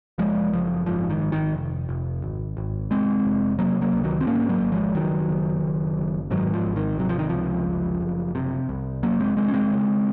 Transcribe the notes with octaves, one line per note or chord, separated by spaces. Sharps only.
F#1 F3 G#3
F#1 F3
G#2 F3
D#3
G#1
D#3
F1
F1
G#1
G#1
F1 G#3 C4
F1
C3 F#3 A#3
F#3 A#3
C#2
D#3 F#3
C4
G#2 A#3 C#4
F#3 A#3
G#1
F3 G#3
F#1 D#3 F#3
F#1
F#1
F#1
G#2 D#3 F#3
F3
G#1
D#3
C3 F#3
F3
D#3
C#2 F3
F#1
F#1
C3
C2
F1 F#3 A#3
G#3 C4
F1 G#3 C4
C#4
G#3 C4
C#3